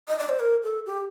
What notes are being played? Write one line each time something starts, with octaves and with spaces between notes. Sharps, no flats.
D#5
D5
C5
A#4
A4
G4